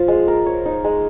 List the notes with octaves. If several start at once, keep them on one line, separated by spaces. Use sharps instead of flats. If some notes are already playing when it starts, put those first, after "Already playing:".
Already playing: F3 F4
G#3
A#4
C#5
D#4
G#3